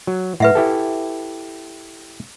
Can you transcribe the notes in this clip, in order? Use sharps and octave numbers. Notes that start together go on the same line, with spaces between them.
F#3
A2 B4 E5 F#5
E4 G4 A4